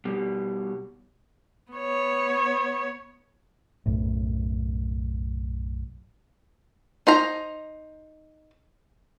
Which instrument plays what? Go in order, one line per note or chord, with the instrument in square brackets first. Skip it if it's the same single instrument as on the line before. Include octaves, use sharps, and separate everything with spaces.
[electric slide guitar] B2 G3
[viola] B3 C#5
[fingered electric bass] B1 F#2 A2
[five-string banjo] D#4 C5 A#5